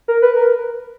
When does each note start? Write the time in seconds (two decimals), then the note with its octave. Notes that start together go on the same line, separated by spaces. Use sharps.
0.08 A#4
0.22 B4
0.36 A#4